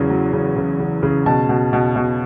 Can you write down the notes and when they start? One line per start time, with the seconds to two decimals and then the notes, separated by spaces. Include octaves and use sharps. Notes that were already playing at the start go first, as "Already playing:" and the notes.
Already playing: E2 C#3 F#3
0.10 F#3
0.33 C#3
0.57 C#3
0.80 C#3
1.03 C#3
1.26 B2 A5
1.49 B2
1.73 B2
1.96 B2